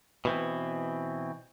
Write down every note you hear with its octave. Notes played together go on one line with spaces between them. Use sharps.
B2 E3 C4